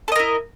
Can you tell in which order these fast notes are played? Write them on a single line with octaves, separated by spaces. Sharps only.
A4 D#5 A#4 E4